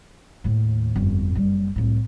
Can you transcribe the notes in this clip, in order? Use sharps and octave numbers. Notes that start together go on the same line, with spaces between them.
D#2 A2
G1 F2
F#1 G3
C2 A2